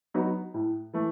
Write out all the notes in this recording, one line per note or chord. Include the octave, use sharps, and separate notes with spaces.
F#3 B3 D#4 F#4
A2
E3 A3